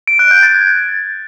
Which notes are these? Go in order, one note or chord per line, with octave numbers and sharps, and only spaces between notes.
D7
F#6
G6
A6
G#6